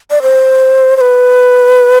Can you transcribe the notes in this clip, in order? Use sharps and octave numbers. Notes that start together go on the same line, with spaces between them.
D5
C5
C5
B4